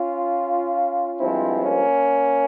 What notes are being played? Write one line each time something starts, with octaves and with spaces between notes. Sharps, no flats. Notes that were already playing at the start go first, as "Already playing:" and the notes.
Already playing: C#4 F4
G2 F3 G#3 C4 E4
A#3 C#4